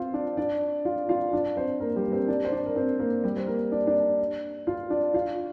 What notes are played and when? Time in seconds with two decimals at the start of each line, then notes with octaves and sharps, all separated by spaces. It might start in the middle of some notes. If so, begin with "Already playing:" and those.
Already playing: C4 F4 C5 F5
0.14 D4 D5
0.37 D4 D5
0.85 F4 F5
1.09 F4 F5
1.33 D4 D5
1.56 C4 C5
1.80 A#3 A#4
1.96 G3 G4
2.06 A#4
2.12 C4 C5
2.28 D4 D5
2.45 C5
2.52 D4 D5
2.66 A#4
2.75 C4 C5
2.99 A#3 A#4
3.24 G3 G4
3.37 C5
3.47 A#3 A#4
3.72 D4 D5
3.87 D4 D5
4.67 F4 F5
4.90 D4 D5
5.14 F4 F5